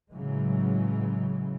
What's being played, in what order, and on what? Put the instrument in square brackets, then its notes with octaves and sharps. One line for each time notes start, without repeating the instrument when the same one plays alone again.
[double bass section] A2 C#3 E3 F#3 G#3